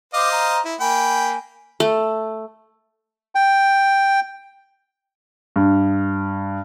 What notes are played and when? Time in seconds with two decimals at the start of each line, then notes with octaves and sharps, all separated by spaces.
0.14 C5 D#5 F5 D6
0.32 A#5
0.65 E4
0.80 A#3 G5 G#5 B5
1.80 A3
3.35 G5
5.56 G2